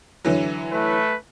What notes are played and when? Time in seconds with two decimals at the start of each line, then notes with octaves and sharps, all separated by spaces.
0.25 D3 E3 F#3
0.72 A3 B4